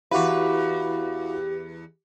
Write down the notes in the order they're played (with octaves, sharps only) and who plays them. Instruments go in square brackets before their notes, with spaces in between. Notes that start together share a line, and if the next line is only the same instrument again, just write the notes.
[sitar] E2 B4 [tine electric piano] E4 F#4 [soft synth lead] G4 [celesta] F5 D6